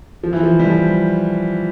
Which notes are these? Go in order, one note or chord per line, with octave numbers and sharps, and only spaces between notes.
F3
E3
F3
G3
F3